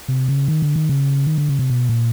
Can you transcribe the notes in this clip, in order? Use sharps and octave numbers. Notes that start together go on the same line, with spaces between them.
C3
C#3
D#3
D3
D#3
C#3
D#3
D3
C#3
C3
B2
A#2